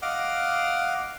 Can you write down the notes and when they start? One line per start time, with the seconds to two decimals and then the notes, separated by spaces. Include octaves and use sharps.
0.02 D#5 F5 F#5 D6